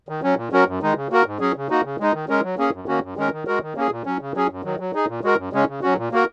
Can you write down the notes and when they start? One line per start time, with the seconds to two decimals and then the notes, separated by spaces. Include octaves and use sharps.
0.09 D#3
0.23 F#3 C#4
0.37 A#2
0.52 F#3 C#4 F#4 A#4
0.67 F#2
0.82 D#3 G#3 D#4
0.96 C#3
1.10 A#3 F#4 A#4
1.26 G#2
1.40 F#3 C#4 G#4
1.56 C#3
1.70 A#3 D#4 F#4
1.85 C#3
2.00 G#3 D#4
2.14 D#3
2.29 G#3 C#4 A#4
2.43 F#3
2.58 A#3 C#4 G#4
2.73 F#2
2.88 D#3 A#3 C#4 F#4
3.02 F#2
3.17 D#3 G#3 C#4 A#4
3.32 D#3
3.47 G#3 F#4 A#4
3.62 D#3
3.76 A#3 C#4 G#4
3.91 A#2
4.06 F#3 C#4
4.21 C#3
4.35 F#3 C#4 G#4
4.50 F#2
4.64 D#3 F#3
4.80 F#3
4.94 D#4 G#4
5.08 A#2
5.23 G#3 F#4 A#4
5.37 F#2
5.53 C#3 G#3 C#4
5.68 C#3
5.82 F#3 C#4 F#4
5.97 A#2
6.12 A#3 F#4 A#4